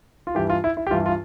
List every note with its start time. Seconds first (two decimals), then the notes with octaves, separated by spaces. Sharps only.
0.27 F4
0.35 G2 E3 G4
0.50 F4
0.64 E4
0.77 E4
0.87 G4
0.91 G2 E3 F4
1.06 F4